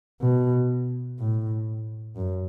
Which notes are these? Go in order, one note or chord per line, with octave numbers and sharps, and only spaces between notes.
B2
A2
F#2